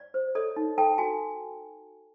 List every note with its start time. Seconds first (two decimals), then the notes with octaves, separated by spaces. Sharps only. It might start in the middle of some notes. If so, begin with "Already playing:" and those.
Already playing: D5
0.14 C5
0.35 A4 C#5 D#5
0.56 D#4
0.78 A4 G5 A5
0.98 F#4 G#5